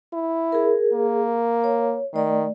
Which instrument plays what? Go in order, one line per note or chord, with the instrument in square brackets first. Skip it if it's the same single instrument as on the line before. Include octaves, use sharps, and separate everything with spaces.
[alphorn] E4
[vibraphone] G#4 A#4
[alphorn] A#3
[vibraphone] C#5
[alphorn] D#3 [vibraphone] A3 D5